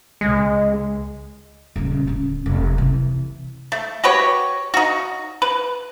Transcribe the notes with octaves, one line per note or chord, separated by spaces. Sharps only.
C#2 G#3
D#1 C#3
D1 C#4
F1
C3 E3
A3
F#4 G4 B4 C#5
D#4 F#4
B4